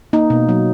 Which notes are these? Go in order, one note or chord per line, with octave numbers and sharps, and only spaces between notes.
A#3 D#4
B2
F#3